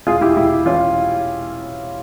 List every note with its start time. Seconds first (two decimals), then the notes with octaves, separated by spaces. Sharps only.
0.07 E1 F4 G#4
0.21 E4 G4
0.36 E1 E4
0.65 E3 C#4 F4